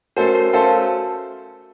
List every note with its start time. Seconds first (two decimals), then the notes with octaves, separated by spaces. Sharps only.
0.17 A3 C#4 F#4 A4 A#4 C5
0.35 F#4 A#4
0.53 A3 C#4 A4 C5 F5 A5